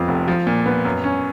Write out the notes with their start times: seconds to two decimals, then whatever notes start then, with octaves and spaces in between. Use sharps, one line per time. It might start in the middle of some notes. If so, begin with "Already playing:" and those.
Already playing: F2 F3 B3
0.08 F1
0.28 F3
0.47 A#2
0.66 B3
0.85 F#2
1.04 C#4